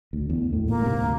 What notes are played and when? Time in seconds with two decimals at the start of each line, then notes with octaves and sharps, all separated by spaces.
0.13 D2
0.30 E2
0.50 D2 A2
0.68 A#2 A#3
0.81 G#2 C3
1.01 D2